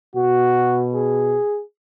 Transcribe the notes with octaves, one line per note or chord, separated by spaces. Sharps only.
B2 F#4
G#4